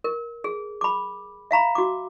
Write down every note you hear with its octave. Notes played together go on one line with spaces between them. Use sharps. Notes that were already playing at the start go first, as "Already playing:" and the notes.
A#4
G#4
B5 D6
E5 F5 A#5 B5
F#4 D6